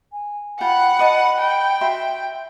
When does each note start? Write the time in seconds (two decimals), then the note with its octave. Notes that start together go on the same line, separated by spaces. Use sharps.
0.12 G#5
0.61 F4 F#5 G5 B5
0.99 B4 D#5 A5
1.39 G5
1.81 F#4 E5 C6